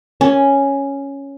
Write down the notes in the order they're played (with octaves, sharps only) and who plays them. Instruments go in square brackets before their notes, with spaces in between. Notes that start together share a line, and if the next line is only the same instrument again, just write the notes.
[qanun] C#4